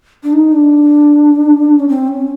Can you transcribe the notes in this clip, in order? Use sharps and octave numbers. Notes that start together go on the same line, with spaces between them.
D4
D#4
D4
C#4
C4
C#4